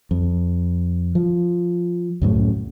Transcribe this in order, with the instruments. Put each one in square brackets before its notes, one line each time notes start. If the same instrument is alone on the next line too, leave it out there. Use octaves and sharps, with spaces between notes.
[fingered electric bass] F2
F3
C#2 F#2 A2 C#3